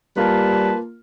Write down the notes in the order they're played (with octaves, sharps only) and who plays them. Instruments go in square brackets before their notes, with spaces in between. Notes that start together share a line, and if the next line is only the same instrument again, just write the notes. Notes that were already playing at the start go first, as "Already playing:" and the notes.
[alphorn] G3 [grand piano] A#3 F4 A#4 [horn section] B4 A5